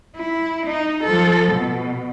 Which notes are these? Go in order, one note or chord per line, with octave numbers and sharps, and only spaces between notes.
E4
D#4
F3 A4
B2